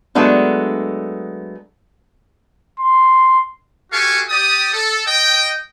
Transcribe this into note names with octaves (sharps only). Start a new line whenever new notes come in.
F#3 G#3 A3 B3 D4
C6
F#4 G4 A4 F5 G#5 C#6
G4 D5 D#6
A4
D#5 G5